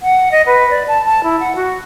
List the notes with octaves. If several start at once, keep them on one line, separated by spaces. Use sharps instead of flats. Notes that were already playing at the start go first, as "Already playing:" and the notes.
F#5
D#5
B4
D5
A5
A5
E4
F#5
F#4